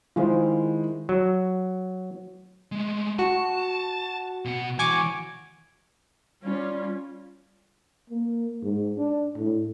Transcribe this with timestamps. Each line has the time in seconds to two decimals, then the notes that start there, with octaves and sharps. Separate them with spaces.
0.16 D#3 G#3 E4 F4 G#4 C5
1.09 F#3
2.72 G#3 A3
3.19 F#4 A5
4.45 B2 F#5
4.79 E3 F#4 G#5 C#6 D6
6.43 G3 C#4 F4
8.10 A#3
8.63 G#2
8.98 D4
9.36 A2